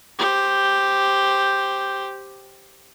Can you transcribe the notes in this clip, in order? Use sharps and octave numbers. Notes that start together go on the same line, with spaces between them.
G4 C5